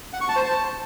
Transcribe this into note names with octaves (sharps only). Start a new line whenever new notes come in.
F#5
C#6
A5
C5
A5